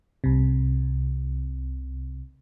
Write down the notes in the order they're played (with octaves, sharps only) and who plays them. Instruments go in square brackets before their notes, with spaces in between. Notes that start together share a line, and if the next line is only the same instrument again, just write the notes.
[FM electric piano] C2 C3